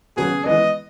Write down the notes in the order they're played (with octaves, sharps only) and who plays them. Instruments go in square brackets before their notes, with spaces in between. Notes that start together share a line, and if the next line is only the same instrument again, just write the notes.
[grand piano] C#3 F#3 B3 F#4 [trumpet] G#4
[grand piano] E3 G#3 B3 [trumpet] D#5